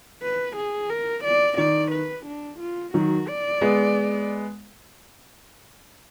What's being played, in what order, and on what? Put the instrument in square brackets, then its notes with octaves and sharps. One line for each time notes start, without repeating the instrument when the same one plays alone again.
[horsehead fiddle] B4
G#4
A#4
D5
[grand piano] D#3 [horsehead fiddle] D5
[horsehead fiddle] B4
D4
F4
[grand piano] D#3 F#3 [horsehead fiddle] F#4
[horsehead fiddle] D5
[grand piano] G#3 B3